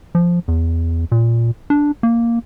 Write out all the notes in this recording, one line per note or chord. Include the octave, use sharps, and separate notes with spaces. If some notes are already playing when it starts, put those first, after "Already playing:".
F3
E2
A#2
D4
A#3